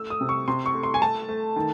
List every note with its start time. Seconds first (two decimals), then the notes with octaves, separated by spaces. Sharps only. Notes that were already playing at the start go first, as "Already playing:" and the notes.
Already playing: A3 E6
0.10 D#6
0.21 C3
0.29 C#6
0.48 C3 C6
0.66 C#6
0.74 A3
0.83 C6
0.94 G#5
1.01 A3 A5
1.29 A3
1.56 D#3